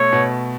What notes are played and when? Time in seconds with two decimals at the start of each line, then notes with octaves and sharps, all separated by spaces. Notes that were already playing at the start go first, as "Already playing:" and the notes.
Already playing: B2 A3 C#5
0.12 B2